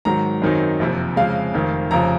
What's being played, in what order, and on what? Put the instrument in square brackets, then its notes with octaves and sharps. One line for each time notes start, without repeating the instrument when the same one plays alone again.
[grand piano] G#2 D#3 F#3 A#5
F#2 D#3 F#3 C4 D#4
F#1 F2 C3
F2 C#3 G#3 F5
F1 F2 D#3
F1 F2 C#3 F3 A#5